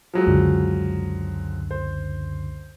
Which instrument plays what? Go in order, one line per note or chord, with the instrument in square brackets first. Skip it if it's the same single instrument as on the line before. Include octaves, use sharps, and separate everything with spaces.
[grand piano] F3 F#3 G#3
[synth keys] C#2 F#2 D3
[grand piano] C5